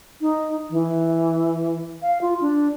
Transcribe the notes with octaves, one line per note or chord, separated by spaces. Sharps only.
D#4
E3
F5
F4
D4